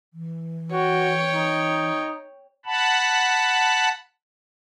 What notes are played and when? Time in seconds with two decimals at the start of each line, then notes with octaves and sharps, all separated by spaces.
0.14 E3
0.72 F#4 C#5 G5
1.34 D#4
2.66 F#5 A5 B5